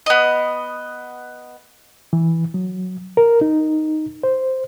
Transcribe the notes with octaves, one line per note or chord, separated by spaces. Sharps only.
B3 D#5
E3
F#3
A#4
D#4
C5